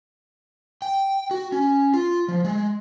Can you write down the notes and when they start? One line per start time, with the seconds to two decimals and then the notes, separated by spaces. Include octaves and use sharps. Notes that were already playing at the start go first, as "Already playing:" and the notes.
0.82 G5
1.31 F#4
1.52 C#4
1.94 F4
2.28 F3
2.45 G#3